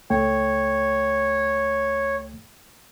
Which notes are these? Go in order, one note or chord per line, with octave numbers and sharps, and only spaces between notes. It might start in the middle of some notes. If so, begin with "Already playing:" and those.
C#2 A3 C#5 G5